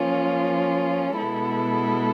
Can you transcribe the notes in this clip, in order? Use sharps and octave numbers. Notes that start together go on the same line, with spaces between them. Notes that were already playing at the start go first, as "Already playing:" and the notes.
Already playing: F3 A#3 C#4 F4
B2 G#3 B3 E4 A4